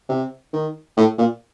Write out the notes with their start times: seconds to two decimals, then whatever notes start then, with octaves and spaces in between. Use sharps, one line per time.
0.09 C3
0.53 D#3
0.97 A2
1.18 A#2